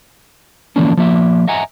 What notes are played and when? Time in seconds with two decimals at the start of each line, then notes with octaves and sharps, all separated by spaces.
0.76 D3 E3 F3 A#3 C#4 D4
0.97 F3 A#3 E5
1.48 D#5 E5 F#5 G#5 A#5